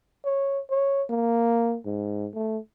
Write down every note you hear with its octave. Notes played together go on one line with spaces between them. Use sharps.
C#5
C#5
A#3
G#2
A3